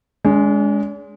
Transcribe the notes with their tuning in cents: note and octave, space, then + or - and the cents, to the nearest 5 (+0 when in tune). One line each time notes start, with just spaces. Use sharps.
G#3 +0 D4 -45